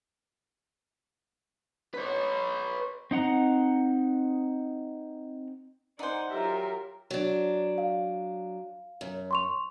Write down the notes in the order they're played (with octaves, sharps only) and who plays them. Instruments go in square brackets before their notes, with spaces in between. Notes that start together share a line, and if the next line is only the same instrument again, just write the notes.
[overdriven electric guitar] B4 C#5
[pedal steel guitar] C4 D#4 F#5 A#5
[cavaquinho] D#4 C5 [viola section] D5 G#5 [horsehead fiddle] F#5
[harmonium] F#3 G4 [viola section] F4 E5 [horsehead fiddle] A#4
[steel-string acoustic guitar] F#3 D4
[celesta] F5
[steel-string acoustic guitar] F#2
[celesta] C6 C#6 F7